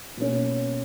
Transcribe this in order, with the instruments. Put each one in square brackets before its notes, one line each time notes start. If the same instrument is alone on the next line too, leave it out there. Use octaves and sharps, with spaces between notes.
[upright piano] B2 A#3 C#4